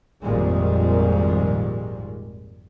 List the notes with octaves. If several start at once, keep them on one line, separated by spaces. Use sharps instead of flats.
G#1 F2 A#2 D#3 G3 G#3